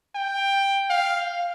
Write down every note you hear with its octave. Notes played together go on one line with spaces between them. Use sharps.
G5
F5